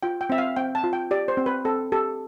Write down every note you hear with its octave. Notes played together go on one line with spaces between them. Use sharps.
F4 G5
G5
C4 E5
F5
C4 G5
A5
F4
G5
G4 D5
C5
C4
B4
C4 A4
G4 A4